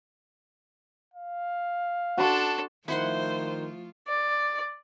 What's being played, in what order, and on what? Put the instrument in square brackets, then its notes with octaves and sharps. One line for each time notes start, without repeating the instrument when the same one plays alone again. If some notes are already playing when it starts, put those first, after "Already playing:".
[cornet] F5
[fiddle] D4 A4 [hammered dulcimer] F#4 C6
[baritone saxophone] D#3 [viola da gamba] F3 A3 F4 [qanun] E4 F#5 C6 [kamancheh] C5
[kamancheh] D5